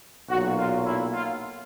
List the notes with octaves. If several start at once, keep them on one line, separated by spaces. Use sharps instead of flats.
B1 A#2 F#3 F#4
F4
E4
F4